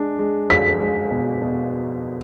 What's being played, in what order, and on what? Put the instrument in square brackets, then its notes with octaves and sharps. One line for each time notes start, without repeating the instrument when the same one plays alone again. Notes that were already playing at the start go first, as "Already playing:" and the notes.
Already playing: [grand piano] G#3 D4
G#3
[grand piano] G#3 [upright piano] B6
[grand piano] G#3
B2
B2